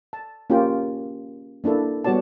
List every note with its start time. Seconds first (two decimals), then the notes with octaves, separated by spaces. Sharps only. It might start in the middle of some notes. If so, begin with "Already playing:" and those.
0.13 A5
0.50 A#3 C#4 F4 G4 G5
1.64 A#3 D4 E4 A4
2.04 G3 B3 F#4 C#5 D5 A5